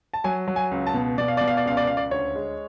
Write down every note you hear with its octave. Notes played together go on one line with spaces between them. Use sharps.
A5
F#3 G#5
F#3
G#5
C#2
A5
B2
B2 D5
F5
B2 D5
F5
D5
C#2 F5
D5
C#2 F5
D5
D2 C#5
G#3